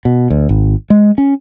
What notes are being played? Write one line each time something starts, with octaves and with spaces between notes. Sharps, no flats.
B2
D2
G#1
G#3
C#4